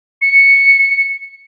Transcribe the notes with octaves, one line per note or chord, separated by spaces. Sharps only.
C#7